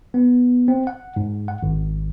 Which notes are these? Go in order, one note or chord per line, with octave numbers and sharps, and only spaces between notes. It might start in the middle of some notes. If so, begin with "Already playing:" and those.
B3
C4
F#5
G#2
F#5
G#1